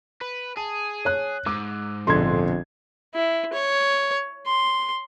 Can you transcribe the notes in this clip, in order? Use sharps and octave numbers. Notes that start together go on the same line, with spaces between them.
B4
G#4 A5
C#5 F#6
G#2 D6 E6
A#1 F2 B2 D3 C6 G#6
E4
C#5
C6